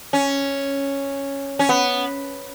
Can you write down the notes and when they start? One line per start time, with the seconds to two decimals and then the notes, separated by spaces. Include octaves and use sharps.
0.13 C#4
1.59 C#4
1.69 B3